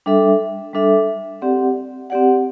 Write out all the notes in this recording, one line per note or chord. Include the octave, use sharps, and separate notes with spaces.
G3 D4 A4 E5
G3 D4 A4 E5
C4 G4 D5 F#5
C4 G4 D5 F#5